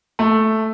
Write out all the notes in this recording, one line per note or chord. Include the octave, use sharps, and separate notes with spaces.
A3